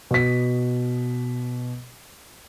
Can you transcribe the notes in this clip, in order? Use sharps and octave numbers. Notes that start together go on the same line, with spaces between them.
B2 B6